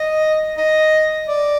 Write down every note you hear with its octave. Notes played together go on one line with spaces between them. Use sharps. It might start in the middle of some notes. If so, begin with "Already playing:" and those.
Already playing: D#5
D#5
D5